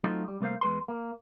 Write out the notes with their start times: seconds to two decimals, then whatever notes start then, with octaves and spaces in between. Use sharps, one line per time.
0.04 F#3 A3 C4 D#4 F4
0.28 G3
0.41 C2 A3 A#3 C5 F5
0.61 E2 G#3 B4 C6
0.88 A#3